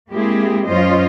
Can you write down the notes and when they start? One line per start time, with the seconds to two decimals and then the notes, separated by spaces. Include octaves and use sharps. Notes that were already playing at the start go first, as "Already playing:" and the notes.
0.11 G#3 A#3 C4 E4 G4 G#4
0.66 F#2 C#4 F4 C5 D#5